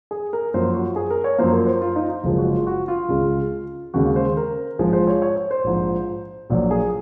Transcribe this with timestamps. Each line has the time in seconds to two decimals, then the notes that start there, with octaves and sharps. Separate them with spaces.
0.11 G#4
0.33 A#4
0.54 F#2 F3 A#3 C5
0.75 F#4
0.96 G#4
1.10 A#4
1.24 C#5
1.38 F#2 F3 A#3 C5
1.53 A#4
1.67 C5
1.82 F4
1.96 D#4
2.09 F4
2.23 F#1 F#2 F3 G#3
2.38 F#4
2.53 F4
2.67 F#4
2.88 F4
3.09 C#2 C#3 G#3
3.94 D#2 C#3 G#3 F#4
4.16 C5
4.37 A#4
4.79 A#1 G#2 F3 G#3 G#4
4.93 C5
5.07 C#5
5.22 C#5
5.36 C#5
5.51 C5
5.64 A#1 G#2 F3
6.50 A#1 A#2 F#3
6.71 G#4